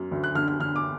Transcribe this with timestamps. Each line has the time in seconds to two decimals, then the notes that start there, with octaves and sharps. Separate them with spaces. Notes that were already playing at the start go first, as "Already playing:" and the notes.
Already playing: F#2
0.11 D2
0.24 F#6
0.35 D3 F6
0.48 F6
0.59 D3 F6
0.76 D6